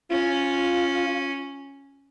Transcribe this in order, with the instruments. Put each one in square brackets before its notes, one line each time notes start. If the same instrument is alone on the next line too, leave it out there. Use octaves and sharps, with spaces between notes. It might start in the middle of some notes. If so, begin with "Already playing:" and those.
[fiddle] C#4 [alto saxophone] F4